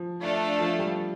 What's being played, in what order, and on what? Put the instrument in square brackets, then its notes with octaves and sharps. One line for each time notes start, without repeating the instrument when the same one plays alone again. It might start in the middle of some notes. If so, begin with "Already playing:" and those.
Already playing: [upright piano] F3
[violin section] A3 D4 A4 F5
[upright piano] F3
G3